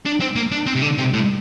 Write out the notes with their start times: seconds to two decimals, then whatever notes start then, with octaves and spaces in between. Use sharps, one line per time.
0.05 D4
0.20 C4
0.36 A#3
0.52 D4
0.66 C4
0.76 C3
0.82 D3
0.98 C3
1.13 A2